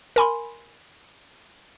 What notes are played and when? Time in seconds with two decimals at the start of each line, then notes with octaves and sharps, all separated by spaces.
0.16 A#4 G#5 B5 C6